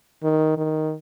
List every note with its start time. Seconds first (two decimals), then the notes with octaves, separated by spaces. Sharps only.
0.23 D#3
0.57 D#3